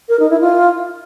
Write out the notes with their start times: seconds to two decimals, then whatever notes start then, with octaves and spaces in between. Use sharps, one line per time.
0.09 A#4
0.19 D#4
0.30 E4
0.40 F4